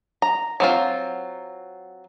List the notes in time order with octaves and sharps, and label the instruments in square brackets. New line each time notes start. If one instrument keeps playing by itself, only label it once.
[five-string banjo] A#5
F#3 C4 F4